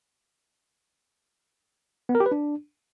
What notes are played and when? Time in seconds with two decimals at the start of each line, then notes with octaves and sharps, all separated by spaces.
2.09 B3
2.15 A#4
2.20 G4
2.26 B4
2.31 D4